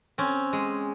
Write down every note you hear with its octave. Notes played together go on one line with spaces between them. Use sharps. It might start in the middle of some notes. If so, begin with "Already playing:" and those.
C4 C#4
G#3